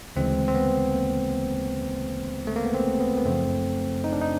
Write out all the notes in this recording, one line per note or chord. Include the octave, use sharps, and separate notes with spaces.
D2 C#3 E3 G#3 C4
C4
B3
A#3
A3
A#3
B3
C4
B3
B3
F#2 C#3 F3 A3 C4
D#4
D4
D#4